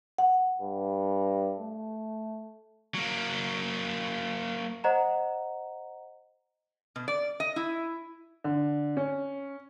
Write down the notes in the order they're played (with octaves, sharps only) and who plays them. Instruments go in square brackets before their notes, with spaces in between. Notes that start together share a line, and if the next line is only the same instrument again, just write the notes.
[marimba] F#5
[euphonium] G2
A3
[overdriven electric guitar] F#3 A#3
[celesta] C5 D#5 F#5 A#5
[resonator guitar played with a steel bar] B2
D5
D#5
E4
[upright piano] D3
C#4